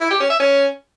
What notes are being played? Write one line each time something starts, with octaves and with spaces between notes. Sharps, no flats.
E4
G4
C#4
E5
C#4